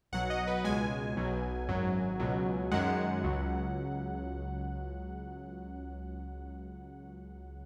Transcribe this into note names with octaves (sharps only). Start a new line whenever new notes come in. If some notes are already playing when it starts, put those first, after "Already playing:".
B1 B2 F#3 F#5
D#5
B4
C#2 B2 G#3 G#5
B1 B2 F#3
G#1 F#2 F#3
C#2 B2 F#3
F#2 D#3 G#3 F#5
C#2 C#3 F#3